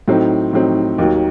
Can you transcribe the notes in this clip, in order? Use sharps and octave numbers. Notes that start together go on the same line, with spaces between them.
A2 F#3 C4 D#4
A2 F#3 C4 D#4
D#2 D#3 F#3